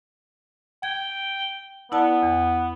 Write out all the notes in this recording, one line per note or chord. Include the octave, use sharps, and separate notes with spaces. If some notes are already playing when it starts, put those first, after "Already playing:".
G5 G#6
B3 E4 D5 A5
E2